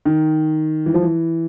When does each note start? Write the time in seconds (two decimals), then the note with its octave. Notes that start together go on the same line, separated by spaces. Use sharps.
0.05 D#3
0.86 E3
0.94 F3
1.03 E3